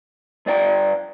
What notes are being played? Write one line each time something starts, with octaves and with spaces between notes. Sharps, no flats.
G2 D5 G5 A#5